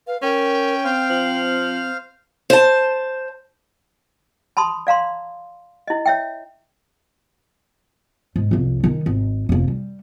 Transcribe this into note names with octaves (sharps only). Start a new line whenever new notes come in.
B4 F5
C#4 A#4 G5
C4 C5 F5 F6
F3
C5 A5
A5 B5 C6 D#6
D5 F5 A#5 C6
E4 D#5
C#5 E5 G5
G#2
C2 F2
D#3 D#4
G#1
F1 A#3
G3